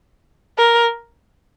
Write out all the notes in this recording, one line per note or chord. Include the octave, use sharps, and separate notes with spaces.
A#4